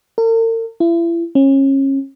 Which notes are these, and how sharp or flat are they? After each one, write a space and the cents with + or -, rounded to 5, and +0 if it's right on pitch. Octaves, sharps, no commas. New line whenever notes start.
A#4 -45
E4 +35
C#4 -30